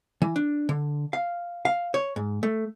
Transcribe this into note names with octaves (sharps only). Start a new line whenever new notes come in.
E3
D4
D3
F5
F5
C#5
G#2
A3